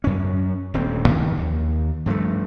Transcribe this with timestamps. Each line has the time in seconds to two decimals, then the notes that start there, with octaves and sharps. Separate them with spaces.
0.04 F#2 C#4
0.74 D#1 D2 C4
1.08 F2 D#3 E3 A#3
1.37 D#2
2.06 G2 F3 G#3 A3